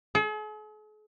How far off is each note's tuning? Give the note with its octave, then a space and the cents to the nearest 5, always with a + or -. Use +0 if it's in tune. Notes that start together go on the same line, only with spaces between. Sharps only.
G#4 +45